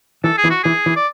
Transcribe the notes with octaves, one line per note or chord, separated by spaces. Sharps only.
E3 A4
G#4
E3
F#4
E3 G#4
E3
D5